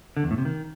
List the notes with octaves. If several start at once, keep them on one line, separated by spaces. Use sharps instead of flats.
D3
E2
A2
C3
D#3